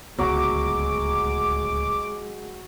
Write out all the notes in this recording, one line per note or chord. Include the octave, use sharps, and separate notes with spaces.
D1 C#2 F#3 G#3 B3 D6